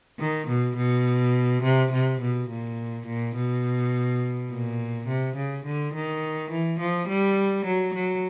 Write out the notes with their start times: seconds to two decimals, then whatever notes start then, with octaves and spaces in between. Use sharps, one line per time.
0.19 D#3
0.48 B2
0.77 B2
1.63 C3
1.92 C3
2.21 B2
2.50 A#2
3.07 A#2
3.36 B2
4.51 A#2
5.08 C3
5.36 C#3
5.66 D3
5.94 D#3
6.51 E3
6.80 F3
7.09 G3
7.66 F#3
7.95 F#3